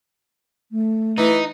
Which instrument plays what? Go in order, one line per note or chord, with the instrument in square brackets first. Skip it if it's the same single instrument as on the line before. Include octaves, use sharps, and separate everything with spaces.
[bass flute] A3
[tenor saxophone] E3 [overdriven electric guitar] D#4